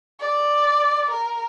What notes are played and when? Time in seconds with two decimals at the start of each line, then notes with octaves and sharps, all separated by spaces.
0.20 D5
1.11 A#4